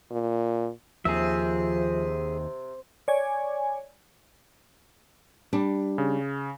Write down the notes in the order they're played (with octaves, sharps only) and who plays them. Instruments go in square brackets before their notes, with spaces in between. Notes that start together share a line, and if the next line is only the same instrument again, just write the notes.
[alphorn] A#2
[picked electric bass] D#2 D#3 [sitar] C3 [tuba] F3 [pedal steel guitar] G#4 E5
[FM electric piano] C#5 D5 G#5
[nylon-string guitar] G3 D4
[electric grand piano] C#3